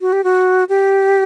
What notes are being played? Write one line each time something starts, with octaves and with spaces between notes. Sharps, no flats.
F#4
G4
F#4
G4